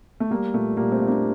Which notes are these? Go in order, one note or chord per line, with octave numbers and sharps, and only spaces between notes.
A3
G3 A#3
A#2 A3
A#2 G3 A#3
A3 C4
A#2
A#3 D4